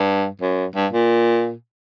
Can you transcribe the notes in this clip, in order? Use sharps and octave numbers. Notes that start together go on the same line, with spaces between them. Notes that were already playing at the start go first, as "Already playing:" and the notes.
Already playing: G2
F#2
G2
A#2